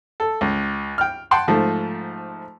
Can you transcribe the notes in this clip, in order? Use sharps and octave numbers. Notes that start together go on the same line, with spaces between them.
A4
C#2
G5 F6
F#5 G5 A5 C6
G#2 F3 A3